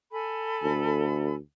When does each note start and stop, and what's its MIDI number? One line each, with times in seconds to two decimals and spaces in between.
0.12 1.35 69
0.12 1.35 80
0.12 1.35 83
0.62 1.37 38